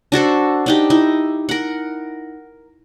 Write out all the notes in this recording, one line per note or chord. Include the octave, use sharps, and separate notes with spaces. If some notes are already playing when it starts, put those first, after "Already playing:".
D4 F#4 A4 C5
D4 D#4 G4
D#4 E4
A#4 F#5